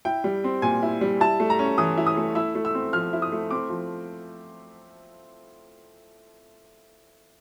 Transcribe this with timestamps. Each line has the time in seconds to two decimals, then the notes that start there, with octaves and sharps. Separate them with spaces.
0.05 E4 G5
0.24 G3
0.44 C4
0.62 A#2 G#5
0.83 E4
1.01 G3
1.20 E4 A5
1.40 A3
1.50 A#5
1.59 C#4
1.78 E3 D#6
1.97 E4
2.06 D#6
2.17 A3
2.35 E4 E6
2.55 A3
2.65 E6
2.75 C4
2.93 F3 F6
3.13 E4
3.22 D#6
3.32 A3
3.51 C4 D6
3.70 F3